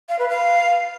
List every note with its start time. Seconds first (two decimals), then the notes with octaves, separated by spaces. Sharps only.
0.09 F5
0.19 B4
0.29 F5